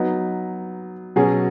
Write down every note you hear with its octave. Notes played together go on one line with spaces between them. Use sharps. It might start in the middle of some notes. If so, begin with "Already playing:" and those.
Already playing: F#3 B3 D#4
B2 F#3 C#4 G#4